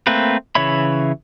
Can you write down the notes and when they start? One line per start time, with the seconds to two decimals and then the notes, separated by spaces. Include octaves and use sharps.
0.07 A3 A#3 C4 B4
0.55 C#3 E3 C#5 E5 B5